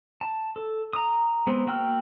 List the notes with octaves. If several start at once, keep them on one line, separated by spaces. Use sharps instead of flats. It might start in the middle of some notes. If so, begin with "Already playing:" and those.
A5
A4
A#5 D#6
G#3 B3 C4
A#3 F#4 G5 E6 F6